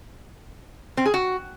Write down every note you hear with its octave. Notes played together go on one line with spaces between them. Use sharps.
C4
G#4
F#4